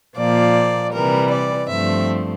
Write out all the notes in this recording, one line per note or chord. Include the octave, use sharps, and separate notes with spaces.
A#2 F3 A#3 D5
C3 E3 G3 A#4
D5
G2 F3 A3 C4 E5